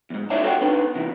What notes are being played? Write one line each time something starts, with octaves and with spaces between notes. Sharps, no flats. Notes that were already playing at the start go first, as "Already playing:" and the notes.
E2 G#2
D#4 E4 C#5 D5 E5 A5
F#4 A4 C#5 D5 F#5 G5
B3 D4 D#4
C3 E3